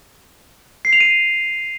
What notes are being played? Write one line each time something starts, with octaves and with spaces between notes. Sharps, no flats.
C7
F7
D#7